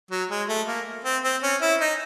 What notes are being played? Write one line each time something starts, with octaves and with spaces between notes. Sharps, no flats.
F#3
G#3
A3
A#3
C4
C4
C#4
E4
D#4